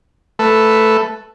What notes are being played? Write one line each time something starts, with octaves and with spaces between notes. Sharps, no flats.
A3 A4 B4